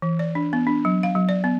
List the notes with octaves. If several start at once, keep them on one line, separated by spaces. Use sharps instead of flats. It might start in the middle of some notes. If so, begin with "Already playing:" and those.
E3
D5
D4
B3
D4
F#3
F5
F#3
D5
B3